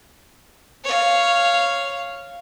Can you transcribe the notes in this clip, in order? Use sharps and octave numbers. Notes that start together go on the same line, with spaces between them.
C#5 F5